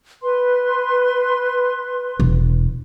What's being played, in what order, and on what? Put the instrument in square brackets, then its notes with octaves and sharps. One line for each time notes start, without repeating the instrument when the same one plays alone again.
[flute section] B4 C6
[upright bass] E1